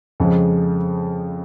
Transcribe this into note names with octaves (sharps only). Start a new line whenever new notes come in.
F2 C#3 F3 G#3